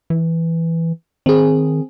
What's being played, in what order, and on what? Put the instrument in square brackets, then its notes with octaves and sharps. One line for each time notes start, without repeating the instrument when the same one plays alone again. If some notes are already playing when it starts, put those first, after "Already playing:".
[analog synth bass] E3
[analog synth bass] D#3 [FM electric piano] C4 G#4